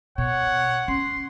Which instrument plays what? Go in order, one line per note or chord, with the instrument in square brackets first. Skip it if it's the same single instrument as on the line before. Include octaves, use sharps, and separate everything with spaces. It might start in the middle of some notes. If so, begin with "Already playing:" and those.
[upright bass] B2 [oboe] C#5 [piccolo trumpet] F#5
[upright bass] C#4 [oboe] C6